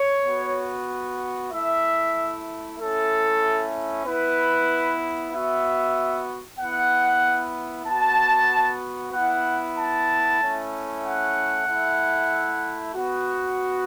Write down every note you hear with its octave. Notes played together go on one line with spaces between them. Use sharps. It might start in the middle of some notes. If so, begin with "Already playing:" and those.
Already playing: C#5
B3 F#4
A3 E4 E5
A3 C#4 E4 A4
B3 E4 B4
B3 F#4 E5
B3 E4 F#5
B3 F#4 A5
B3 E4 F#5
A5
A3 C#4 E4
F#5
A3 E4
B3 F#4